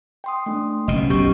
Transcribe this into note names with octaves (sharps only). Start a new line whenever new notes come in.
G5 C6 D#6
A3 D4
F#1 B2 C#4 D#5
B1 B2 G4 C#6 G6